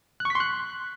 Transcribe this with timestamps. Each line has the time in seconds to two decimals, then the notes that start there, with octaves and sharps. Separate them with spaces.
0.20 F#6
0.25 C#6
0.30 B6
0.35 C6
0.40 F#6